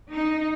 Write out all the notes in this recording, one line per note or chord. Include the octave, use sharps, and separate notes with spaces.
D#4